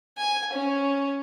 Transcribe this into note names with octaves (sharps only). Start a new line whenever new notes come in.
G#5
C#4